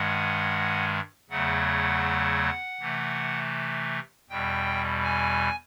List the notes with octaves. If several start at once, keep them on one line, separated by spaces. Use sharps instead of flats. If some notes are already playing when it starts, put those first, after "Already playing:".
Already playing: G2 D#3 G#3 F#5
E2 C#3 F#3 A3 F#5
C3 E3 A3
E2 B2 G3 G5
G#5